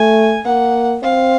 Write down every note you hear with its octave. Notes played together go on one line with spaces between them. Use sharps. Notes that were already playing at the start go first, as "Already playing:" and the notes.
Already playing: A3 G#5
A#3 F#5
C4 F5